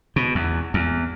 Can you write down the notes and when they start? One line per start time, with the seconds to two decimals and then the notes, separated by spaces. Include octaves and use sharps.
0.16 B2
0.35 E2
0.74 E2